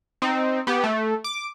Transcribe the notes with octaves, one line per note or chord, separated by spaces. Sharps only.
C4 D#4
B3 G4
A3
D6